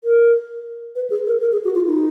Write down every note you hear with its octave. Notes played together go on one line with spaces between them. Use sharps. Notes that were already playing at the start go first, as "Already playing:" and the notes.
A#4
B4
G#4
A#4
A#4
G#4
F#4
F4
D#4